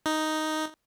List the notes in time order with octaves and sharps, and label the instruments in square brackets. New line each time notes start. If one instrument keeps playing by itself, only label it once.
[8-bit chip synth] D#4